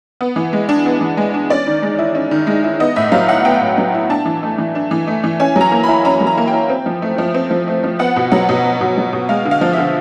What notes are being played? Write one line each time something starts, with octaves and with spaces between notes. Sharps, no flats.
B3
E3
G#3
D4
B3
E3
G#3
D4
C#4 D5
D#3
G#3
E4
C#4
D#3
G#3
E4
B3 D#5
A2 E5
F#3 F5
E4 F#5
B3 G5
A2
F#3
E4
D4 A5
E3
A3
E3
D4
E3
A3
E3
C#4 G#5
F#3
A#5
A#3
E4 B5
C#4 A#5
F#3
A#5
A#3
G5
E4
C4
F3
A3
F3
C4
F3
A3
F3
B3 F#5
B2
F#3 F#5
B2
B3
B2
F#3
B2
G#3 F5
D3
F5
F3
D3 E5